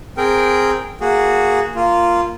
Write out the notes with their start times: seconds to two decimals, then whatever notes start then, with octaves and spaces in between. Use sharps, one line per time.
0.17 C4 G#4 A#4 G5
1.01 A#3 F#4 G#4
1.75 A#3 F4